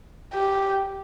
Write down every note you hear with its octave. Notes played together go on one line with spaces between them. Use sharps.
G4